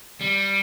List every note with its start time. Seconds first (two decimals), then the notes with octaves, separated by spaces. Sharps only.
0.21 G3